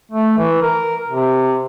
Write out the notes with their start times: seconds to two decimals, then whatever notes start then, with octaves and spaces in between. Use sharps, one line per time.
0.11 A3
0.38 E3
0.62 A#4
1.08 C3